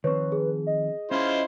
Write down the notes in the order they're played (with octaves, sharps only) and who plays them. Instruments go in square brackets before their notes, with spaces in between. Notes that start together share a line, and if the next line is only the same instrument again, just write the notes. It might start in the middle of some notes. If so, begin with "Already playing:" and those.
[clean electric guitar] D#3 F3 C4 [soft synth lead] B4 [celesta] C#5 C#6
[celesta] G#4
[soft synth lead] D#5
[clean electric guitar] C#4 [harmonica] E4 F4 C5